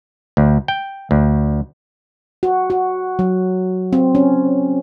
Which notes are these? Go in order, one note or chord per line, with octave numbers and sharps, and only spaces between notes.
D2
G5
D2
F#4
F#4
F#3
C4
C#4